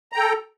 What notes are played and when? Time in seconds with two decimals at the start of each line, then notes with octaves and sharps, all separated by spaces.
0.12 A#5
0.15 G5
0.18 A4